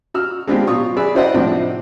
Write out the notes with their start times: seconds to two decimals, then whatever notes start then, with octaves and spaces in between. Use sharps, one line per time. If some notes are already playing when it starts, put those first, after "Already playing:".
0.14 F#4 E6 F6
0.48 G#3 B3 C4 D4 F4 G4
0.67 B2 F#3 F4 C#6 D#6
0.97 G#4 B4 D5 E6
1.15 E4 F#4 C5 D5 D#5 F#5
1.34 A2 C3 F3 C4 D4 D#4